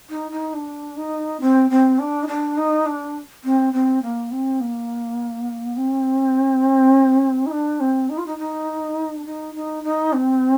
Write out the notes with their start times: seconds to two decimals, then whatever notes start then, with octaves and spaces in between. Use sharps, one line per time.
0.10 D#4
0.31 D#4
0.54 D4
0.97 D#4
1.41 C4
1.70 C4
1.99 D4
2.23 D#4
2.27 D4
2.57 D#4
2.86 D4
3.44 C4
3.73 C4
4.02 A#3
4.31 C4
4.61 A#3
5.77 C4
7.46 D#4
7.51 D4
7.80 C4
8.10 D#4
8.18 F4
8.26 D#4
8.38 D#4
9.18 D4
9.25 D#4
9.54 D#4
9.84 D#4
10.13 C4